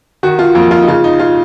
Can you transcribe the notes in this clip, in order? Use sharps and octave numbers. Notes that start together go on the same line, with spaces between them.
D#3 F#4
F4
F2 A#3
F4
D#4
C#3 F4
D#4
F4